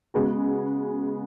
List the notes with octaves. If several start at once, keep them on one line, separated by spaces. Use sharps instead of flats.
C#3 G#3 B3 F#4